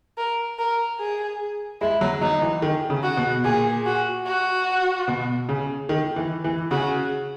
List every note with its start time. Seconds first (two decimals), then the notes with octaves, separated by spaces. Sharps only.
0.18 A#4
0.59 A#4
0.99 G#4
1.81 G#3 E4
2.01 F#3
2.21 F#3 D#4
2.42 E3
2.62 D#3
2.90 C#3
3.03 F#4
3.17 B2
3.44 A#2 G#4
3.86 F#4
4.27 F#4
5.08 B2
5.49 C#3
5.89 D#3
6.16 E3
6.44 E3
6.71 C#3 F#4